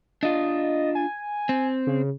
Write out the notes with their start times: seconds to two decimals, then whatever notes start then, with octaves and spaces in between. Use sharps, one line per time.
0.23 D4 F4 D#5
0.95 G#5
1.49 C4
1.87 C#3